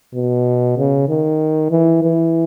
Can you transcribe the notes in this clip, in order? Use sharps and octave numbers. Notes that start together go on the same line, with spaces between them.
B2
C#3
D#3
E3
E3